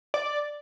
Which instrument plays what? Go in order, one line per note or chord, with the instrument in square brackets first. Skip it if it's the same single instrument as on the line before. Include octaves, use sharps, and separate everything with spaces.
[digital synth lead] D5